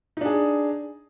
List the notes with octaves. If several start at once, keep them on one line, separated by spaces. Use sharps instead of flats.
D4 D#4 G#4